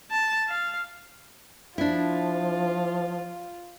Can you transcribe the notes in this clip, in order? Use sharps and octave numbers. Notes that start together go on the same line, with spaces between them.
A5
F5
F3 D4 E4 F4